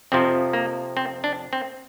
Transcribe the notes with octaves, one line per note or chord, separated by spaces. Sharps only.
F2 C3 F3 C4
A#3
C4
D4
C4